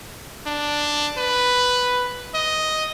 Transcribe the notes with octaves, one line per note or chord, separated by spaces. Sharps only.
D4
B4
D#5